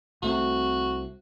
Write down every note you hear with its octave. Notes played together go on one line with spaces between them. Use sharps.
C2 A3 C4 F#4